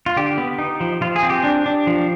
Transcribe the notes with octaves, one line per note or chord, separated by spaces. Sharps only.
F4
D3 G4
B3
D#4
F3
F3 F4
G#4
C4
G4
D4
D4
F3